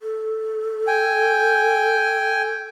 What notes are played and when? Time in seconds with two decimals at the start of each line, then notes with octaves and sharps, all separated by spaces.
0.01 A4
0.87 G5 G#5